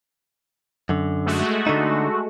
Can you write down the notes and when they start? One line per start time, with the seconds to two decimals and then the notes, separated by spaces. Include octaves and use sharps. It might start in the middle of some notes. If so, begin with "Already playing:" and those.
0.89 F#2 D3
1.26 G#3 A3 F#4
1.67 D3 D#4